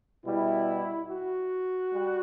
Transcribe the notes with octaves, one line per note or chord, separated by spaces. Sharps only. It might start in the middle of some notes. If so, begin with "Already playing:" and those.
B2 G3 E4
F#4
G3